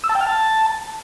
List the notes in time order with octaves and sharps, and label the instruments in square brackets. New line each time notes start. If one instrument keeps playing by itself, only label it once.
[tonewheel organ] E6
A5
G5
F6
A5